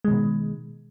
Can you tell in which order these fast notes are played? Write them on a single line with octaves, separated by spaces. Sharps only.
G#3 D#3 B2